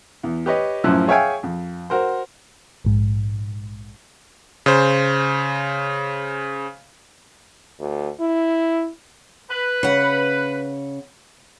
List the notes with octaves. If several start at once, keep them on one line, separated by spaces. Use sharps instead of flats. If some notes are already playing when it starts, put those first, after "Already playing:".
E2
G4 B4 C#5 D#5
F#2 A2 F3 C#4 E6 F#6
G#4 C#5 E5 F5 G5 G#5
F2
F#4 A#4 C5
A#1 G#2
C#3 C5
D2
E4
B4
C#3 F#5